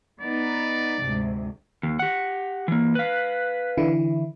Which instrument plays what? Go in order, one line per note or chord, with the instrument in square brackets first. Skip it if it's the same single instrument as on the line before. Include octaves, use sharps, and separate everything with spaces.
[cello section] B3 D#4 [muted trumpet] D5
[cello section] D2 G#2 C3
[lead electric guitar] D#2
G4 F#5
E3 A#3
[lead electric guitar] B4 F5 [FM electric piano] F#6 B6
[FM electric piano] D3 E3 E4